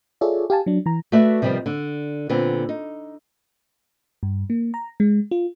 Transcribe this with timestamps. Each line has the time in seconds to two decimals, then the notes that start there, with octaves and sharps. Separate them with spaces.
0.21 F4 G#4 A4 C#5 D5 E5
0.50 G4 F5 G#5 A5
0.66 F#3 D4
0.86 E3 A#5
1.12 A3 F#4 B4 D5 E5
1.42 C3 D#3 F3 G3 B3
1.66 D3
2.29 A#2 D3 B3 C4
2.69 D#4
4.23 G2
4.50 A#3
4.74 A#5
5.00 G#3
5.31 F4